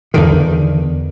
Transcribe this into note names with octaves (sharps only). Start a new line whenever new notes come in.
E2 D3 D#3